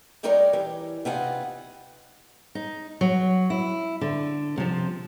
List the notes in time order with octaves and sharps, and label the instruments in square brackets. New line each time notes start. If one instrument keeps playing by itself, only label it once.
[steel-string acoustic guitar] G3 C4 D#4 A#4 C#5 D5
E3 G4
C3 B3 D#4 F4 F#5 G#5
D#4
F#3
E4
D3
C3 F3